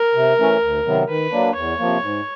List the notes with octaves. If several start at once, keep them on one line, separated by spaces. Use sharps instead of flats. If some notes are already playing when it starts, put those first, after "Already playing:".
Already playing: A#4
C3
E3 A3 C#4
D2
C3 D#3 F#3 B3
D#3 B4
F#3 A#3 D4
E2 C#5
C3 F3 A#3
G#2